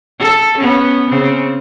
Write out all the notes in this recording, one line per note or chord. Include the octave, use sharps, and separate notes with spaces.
A4
B3 C#4
C#3 C4